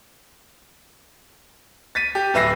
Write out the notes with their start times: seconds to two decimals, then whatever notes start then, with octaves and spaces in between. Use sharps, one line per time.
1.95 A6 B6 D#7
2.15 G4
2.34 D1 B4 E5 E6 A#6 C7